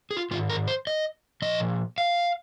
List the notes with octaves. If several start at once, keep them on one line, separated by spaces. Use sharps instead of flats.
G#4
F4
G#2 D#3 F4
A#4
C5
D#5
A#2 F3 D#5
F5